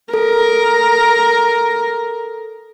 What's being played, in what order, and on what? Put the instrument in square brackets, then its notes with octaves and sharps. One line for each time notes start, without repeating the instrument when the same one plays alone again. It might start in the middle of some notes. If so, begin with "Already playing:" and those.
[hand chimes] A4 [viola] A#4